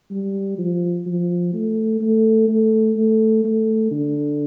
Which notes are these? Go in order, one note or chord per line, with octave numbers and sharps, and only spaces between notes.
G3
F3
F3
A3
A3
A3
A3
A3
D3